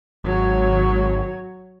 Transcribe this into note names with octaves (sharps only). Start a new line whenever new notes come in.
G#1 F#3 C#5